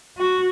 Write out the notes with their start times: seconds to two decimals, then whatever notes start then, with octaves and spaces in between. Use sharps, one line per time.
0.18 F#4